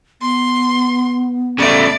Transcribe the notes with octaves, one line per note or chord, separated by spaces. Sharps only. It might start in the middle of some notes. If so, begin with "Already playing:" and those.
B3 C6
C#3 A3 D5